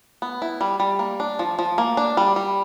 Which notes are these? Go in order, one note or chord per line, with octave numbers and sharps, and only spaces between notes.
B3
E4
G3
G3
A#3
D4
F3
F3
A#3
D4
G3
G3